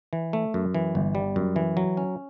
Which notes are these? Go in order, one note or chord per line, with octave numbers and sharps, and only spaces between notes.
E3
A3
F#2
E3
G1
G3
F#2
E3
F#3
C#4